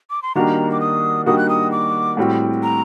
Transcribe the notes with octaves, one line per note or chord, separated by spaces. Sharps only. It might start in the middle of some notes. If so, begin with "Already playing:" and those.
D6
C6
D#3 G3 A#3 D4 F#4 A#5
D6
D#6
D#3 G3 A#3 D4 F#4 D#6
F#6
D#6
D6
A2 G3 C4 F#4
A#5